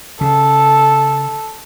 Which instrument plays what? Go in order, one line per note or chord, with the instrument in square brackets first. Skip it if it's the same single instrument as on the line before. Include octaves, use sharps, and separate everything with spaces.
[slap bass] C#3 [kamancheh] A4